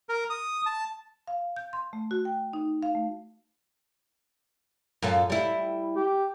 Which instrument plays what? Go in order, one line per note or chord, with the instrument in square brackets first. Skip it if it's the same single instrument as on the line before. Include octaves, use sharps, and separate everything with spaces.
[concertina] A#4
D#6
A5
[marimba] F5
G6
C6
A3
F#4
G5
D#4
F5
A3
[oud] F#2 F4 A4
G3 E4
[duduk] G4